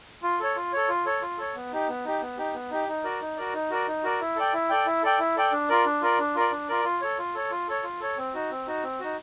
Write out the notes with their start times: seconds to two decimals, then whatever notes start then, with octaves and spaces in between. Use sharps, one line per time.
0.23 F4
0.40 A4 C#5
0.56 F4
0.73 A4 C#5
0.89 F4
1.05 A4 C#5
1.22 F4
1.38 A4 C#5
1.55 B3
1.72 D#4 G4
1.88 B3
2.05 D#4 G4
2.22 B3
2.38 D#4 G4
2.54 B3
2.71 D#4 G4
2.88 D#4
3.04 F#4 A#4 D5
3.21 D#4
3.37 F#4 A#4 D5
3.54 D#4
3.70 F#4 A#4 D5
3.87 D#4
4.03 F#4 A#4 D5
4.21 E4
4.36 A4 D5 G5
4.54 E4
4.70 A4 D5 G5
4.86 E4
5.03 A4 D5 G5
5.19 E4
5.36 A4 D5 G5
5.52 D4
5.69 F4 A#4 D5
5.86 D4
6.02 F4 A#4 D5
6.19 D4
6.35 F4 A#4 D5
6.52 D4
6.68 F4 A#4 D5
6.84 F4
7.01 A4 C#5
7.18 F4
7.35 A4 C#5
7.51 F4
7.68 A4 C#5
7.83 F4
8.00 A4 C#5
8.17 C4
8.34 D#4 F#4
8.51 C4
8.67 D#4 F#4
8.83 C4
9.00 D#4 F#4